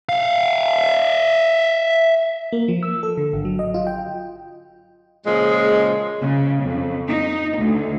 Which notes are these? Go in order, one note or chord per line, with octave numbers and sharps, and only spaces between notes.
E5 F5
A#3
F3
E6
A4
D3
G#1
F#3
D#5
F4
G5
A#2 C#3 F3 G#3
C#3
F2
D#4
D2